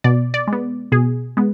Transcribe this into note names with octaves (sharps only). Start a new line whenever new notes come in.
B2 D5
D5
G#3
B3
B2 G#4
G#3 B3